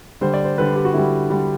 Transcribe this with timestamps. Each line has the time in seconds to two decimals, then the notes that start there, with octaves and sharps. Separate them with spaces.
0.21 D3 G3 C5
0.34 D5
0.45 C5
0.58 D3 G3 B4
0.76 G4
0.85 F#4
0.94 D3 G3 E4
1.30 D3 G3